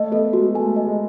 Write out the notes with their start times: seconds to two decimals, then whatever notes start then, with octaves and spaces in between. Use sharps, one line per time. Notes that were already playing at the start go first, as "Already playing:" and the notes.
Already playing: A3 D#5
0.12 B3 A4
0.33 G#3 F#4
0.54 A3 G#5
0.76 D#5
0.87 G#3